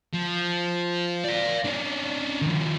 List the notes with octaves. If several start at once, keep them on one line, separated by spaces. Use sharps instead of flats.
F3
D5 F5
C#4 D4
D#3 F3